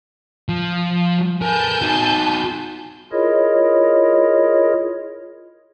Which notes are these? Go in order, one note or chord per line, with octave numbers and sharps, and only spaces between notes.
F3
A#4 B4 G#5 A5 G6
D#4 F#4
E4 F4 G#4 A#4 C#5 D#5